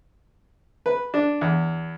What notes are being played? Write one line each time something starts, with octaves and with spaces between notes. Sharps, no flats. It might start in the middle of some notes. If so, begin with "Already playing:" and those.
B4
D4
E2